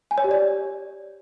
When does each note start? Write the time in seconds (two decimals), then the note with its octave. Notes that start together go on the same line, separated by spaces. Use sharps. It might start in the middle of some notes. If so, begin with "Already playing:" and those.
0.11 G#5
0.18 C#5
0.24 G4
0.31 D5